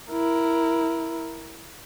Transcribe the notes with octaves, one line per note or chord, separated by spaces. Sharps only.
E4 A#4